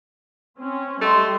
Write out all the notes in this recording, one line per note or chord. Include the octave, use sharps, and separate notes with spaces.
C4 C#4
G3 A3 D#5 C6